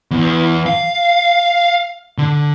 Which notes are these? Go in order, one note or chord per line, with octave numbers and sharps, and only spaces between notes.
E2
F5
D3